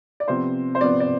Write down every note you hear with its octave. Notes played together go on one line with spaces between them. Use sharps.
D5
C3 F3 B3 C5
C5
C3 F3 B3 D5
D5